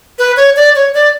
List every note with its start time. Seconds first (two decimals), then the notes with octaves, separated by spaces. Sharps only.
0.19 B4
0.37 C#5
0.56 D5
0.76 C#5
0.94 D5